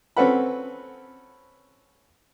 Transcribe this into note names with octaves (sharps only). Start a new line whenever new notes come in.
C4 C#4 A4 B4 F#5 B5